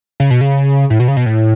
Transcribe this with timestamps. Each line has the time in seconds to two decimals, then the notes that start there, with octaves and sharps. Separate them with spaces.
0.20 C#3
0.31 B2
0.41 C#3
0.90 A2
1.00 B2
1.08 C#3
1.17 B2
1.26 A2